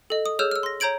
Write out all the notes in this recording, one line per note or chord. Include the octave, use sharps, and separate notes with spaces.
A4 D#5
D#6
G#4 C#5 E6 F6 G6 E7
E6 F6
C6 A#6
C#5 A#5 G6 G#6 D7 F#7